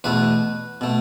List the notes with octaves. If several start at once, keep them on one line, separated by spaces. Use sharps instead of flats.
E2 B2 A3 B4
B2 A3